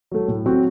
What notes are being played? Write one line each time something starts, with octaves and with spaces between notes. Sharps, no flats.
F#3 A3
A2
F#3 C4 F#4